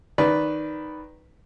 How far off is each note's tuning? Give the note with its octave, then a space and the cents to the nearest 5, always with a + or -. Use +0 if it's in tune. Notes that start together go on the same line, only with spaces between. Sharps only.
D#3 +0 B4 +0 D5 -10